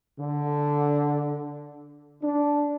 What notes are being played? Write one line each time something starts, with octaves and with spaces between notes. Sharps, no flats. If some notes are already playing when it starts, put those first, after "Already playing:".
D3
D4